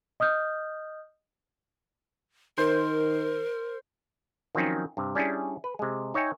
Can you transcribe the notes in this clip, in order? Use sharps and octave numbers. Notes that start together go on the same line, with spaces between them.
D#5 D#6 F6 G6
D#3 A#4 C5
D#3 F3 F#3 C4 C#4 D#4
G2 C3
G3 C#4 D4 E4 G#4
B4
C3 G#3
D#4 C#5 E5 G5 G#5